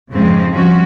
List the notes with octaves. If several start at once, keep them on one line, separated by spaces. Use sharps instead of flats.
F2 G#2 C#3 F3 G#3 C4
F3 G3 C#4 F#4